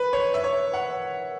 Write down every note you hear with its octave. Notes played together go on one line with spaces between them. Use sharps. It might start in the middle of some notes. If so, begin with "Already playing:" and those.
Already playing: B4
C#5
E5
C#5
F#5